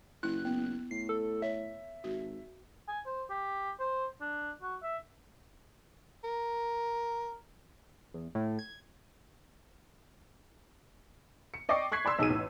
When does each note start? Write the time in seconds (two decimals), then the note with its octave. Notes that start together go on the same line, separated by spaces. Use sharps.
0.23 F#1 E4 F#6
0.45 B3
0.91 A2 C7
1.09 A4
1.42 C#5 E5
2.04 G#1 F#4
2.88 G#5
3.06 C5
3.30 G4
3.80 C5
4.21 D4
4.62 F#4
4.83 E5
6.24 A#4
8.14 E2
8.35 A2
8.59 G#6
11.54 C#7
11.69 D5 D#5 G5 C#6 D6 C7
11.92 C#6 F#6 G#6 B6 C7
12.05 D5 B5 C6 E6
12.19 B1 D#4 G#4 D#7
12.30 A1